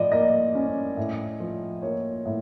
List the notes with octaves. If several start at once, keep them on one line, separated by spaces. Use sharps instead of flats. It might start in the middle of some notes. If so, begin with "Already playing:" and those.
Already playing: A2 F3 D5 D#5
A#3 D#5
C#4
A2
F3
A#3 C#5
A2